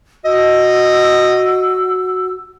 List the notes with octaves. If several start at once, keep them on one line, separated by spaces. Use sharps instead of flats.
F#4 D#5 E6